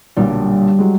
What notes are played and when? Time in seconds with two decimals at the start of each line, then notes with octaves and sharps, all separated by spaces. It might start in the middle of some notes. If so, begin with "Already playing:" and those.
0.17 B1 A#2 D3 G3
0.79 F#3 G#3